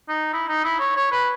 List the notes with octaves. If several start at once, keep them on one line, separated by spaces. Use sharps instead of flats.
D#4
E4
D#4
E4
C#5
C#5
B4